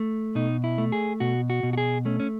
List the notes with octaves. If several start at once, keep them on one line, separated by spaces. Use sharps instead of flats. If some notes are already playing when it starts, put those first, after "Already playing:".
Already playing: A3
B2 D#4
E4
A3
G#4
B2 F#4
F#4
B2
F#4
G#4
A3 C#4
C#4